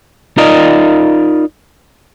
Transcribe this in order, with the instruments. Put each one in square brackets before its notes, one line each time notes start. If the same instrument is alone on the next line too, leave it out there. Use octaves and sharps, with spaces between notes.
[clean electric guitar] D#4 F4 A#4 D5 D#5